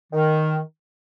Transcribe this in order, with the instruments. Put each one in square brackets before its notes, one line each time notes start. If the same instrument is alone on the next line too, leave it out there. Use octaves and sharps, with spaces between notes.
[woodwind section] D#3